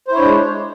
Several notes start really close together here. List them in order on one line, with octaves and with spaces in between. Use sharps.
C5 E4 C#5 D4 G#3